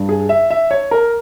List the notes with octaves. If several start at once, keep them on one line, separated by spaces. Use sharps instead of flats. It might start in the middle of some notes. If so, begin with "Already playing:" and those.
Already playing: G2
G#4
E5
E5
C#5
A#4